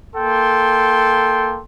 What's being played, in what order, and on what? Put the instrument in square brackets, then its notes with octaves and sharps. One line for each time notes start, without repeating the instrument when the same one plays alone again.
[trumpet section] A#3 A4 G5 C6